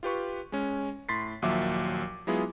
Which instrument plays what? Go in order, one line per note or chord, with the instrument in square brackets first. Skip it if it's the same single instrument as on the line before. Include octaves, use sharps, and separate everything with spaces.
[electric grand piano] F4 G4 B4 C#6
G#3 C#4
A2 C6 A6 B6 C7
D#2 A#2 F3 F#3 E5 D6
F#3 G#3 B3 E4 F4 G#4